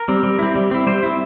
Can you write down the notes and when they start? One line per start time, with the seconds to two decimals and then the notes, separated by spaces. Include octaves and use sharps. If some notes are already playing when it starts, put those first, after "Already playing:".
Already playing: A#4
0.08 G3 C4
0.23 G3
0.39 C4 E4
0.55 G3
0.71 C4 E4
0.87 G3 C5
1.03 C4 E4